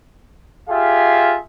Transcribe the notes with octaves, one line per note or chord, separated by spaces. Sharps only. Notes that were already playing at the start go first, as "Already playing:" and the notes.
F4 G4 G#4 E5 F5